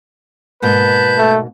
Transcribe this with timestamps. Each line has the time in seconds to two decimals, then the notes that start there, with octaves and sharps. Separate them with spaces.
0.62 G#2 B2 A#3 B4 A5 G6
1.18 A3